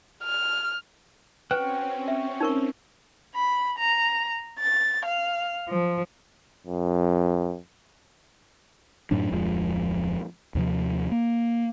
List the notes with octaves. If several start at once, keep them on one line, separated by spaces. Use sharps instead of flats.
F6
C4 C#4 F#4 B4 G5 F#6
E5
D#4 A#4 C#6
B5
A#5
A6
F5
F3
F2
F#2 A2 F#3 D4
D1 F2 F3 G#3
D#2 C3 F3
A#3